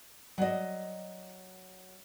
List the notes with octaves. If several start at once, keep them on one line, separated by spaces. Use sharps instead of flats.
F#3 D5 D#5